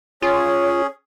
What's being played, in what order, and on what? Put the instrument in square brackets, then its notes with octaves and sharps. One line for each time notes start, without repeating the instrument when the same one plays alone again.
[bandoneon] C#4 G#4 [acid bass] F4 [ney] C#5